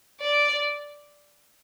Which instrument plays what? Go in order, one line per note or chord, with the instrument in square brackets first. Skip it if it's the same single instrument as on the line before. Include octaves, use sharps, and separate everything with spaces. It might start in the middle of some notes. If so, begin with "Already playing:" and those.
[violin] D5